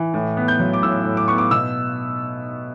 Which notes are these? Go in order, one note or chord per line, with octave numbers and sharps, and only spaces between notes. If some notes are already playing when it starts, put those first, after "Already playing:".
Already playing: E3
A2
B3
G6
F#3
D6
A2 E6
A2
D6
B3 C#6
D6
B2 E6